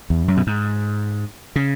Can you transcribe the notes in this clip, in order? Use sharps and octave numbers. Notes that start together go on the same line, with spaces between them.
E2
F#2
B2
G#2
C#3